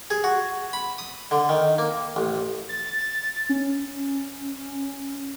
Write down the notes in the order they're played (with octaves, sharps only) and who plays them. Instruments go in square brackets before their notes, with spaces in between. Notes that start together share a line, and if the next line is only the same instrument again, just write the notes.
[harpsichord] G#4
F#4
B5
D#6
D3
D#3
A#3
A1
[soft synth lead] A6
C#4